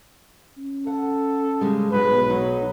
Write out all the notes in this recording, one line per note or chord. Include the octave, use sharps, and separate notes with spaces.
C#4
A4 F#5
C#3 G3 G#3
B1 G#2 B2 G#3 B4
F#3 D#4